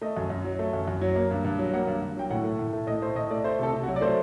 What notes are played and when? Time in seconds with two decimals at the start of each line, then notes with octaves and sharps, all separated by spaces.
0.01 A3 D#5
0.17 F#2
0.30 F#2
0.44 F#3
0.59 A3
0.73 F#2
0.88 F#2
1.01 F#3
1.16 A#3
1.31 G2
1.44 G2
1.59 F#3
1.74 A#3 F#5
1.87 G2
2.02 G2
2.16 F#3 G5
2.30 A2 F#5
2.44 A3
2.59 A2
2.73 A3
2.87 A2 D#5
3.02 A3 C5
3.15 A2 D#5
3.31 A3 D5
3.44 A3 C5
3.59 C3 A4
3.73 C3
3.83 F#4
3.88 F#3
3.96 D5
4.01 A3 C5